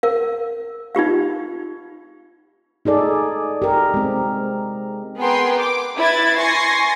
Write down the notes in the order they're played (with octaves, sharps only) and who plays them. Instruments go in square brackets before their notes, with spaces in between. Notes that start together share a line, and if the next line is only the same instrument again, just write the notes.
[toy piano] A#4 F5
D#4 F4 G4 F5
[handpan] D#4 G#4 A4 D5
G4 A#4
G#3 C4
[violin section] B3 G#4 A#4 B4 G5 C6
D6
E4 B4 G#6 A6
G#5 C6 C#6 A6 A#6 C7